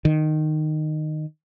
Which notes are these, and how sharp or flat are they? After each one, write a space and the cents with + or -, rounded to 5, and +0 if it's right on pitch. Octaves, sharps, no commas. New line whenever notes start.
D#3 -15